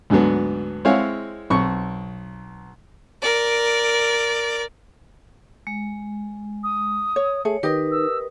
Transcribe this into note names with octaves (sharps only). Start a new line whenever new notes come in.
D2 G#2 D3 F#3 B3
G#3 C4 E4 C#5 F5 F#5
B1 C4 C#6
A#4 D5
G#3
D#6
C#5
A3 G#4 C#5
D#3 G4 A#4 B4 D#5 D#6
E6